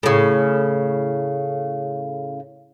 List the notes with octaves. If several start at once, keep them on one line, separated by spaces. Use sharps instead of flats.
A2 C#3